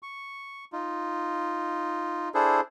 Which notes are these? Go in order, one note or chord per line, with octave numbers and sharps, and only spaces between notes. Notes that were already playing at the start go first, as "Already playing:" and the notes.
C#6
D#4 F4
D4 E4 G#4 A4 C5